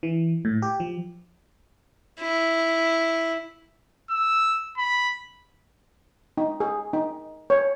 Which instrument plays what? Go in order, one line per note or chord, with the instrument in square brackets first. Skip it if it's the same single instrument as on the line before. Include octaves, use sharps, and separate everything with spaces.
[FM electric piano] E3
A2
G4
F3
[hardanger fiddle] E4
[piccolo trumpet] E6
B5
[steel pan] D#4
G#4
D#4
C#5